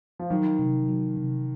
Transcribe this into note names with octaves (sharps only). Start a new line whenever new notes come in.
F3
D#3 F#3
C3
F#3
C3